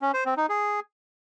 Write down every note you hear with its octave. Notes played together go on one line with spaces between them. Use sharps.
C#4
C5
C4
D#4
G#4